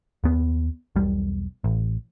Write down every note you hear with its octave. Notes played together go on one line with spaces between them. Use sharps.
D#2 B3
E1 B1 G3
A1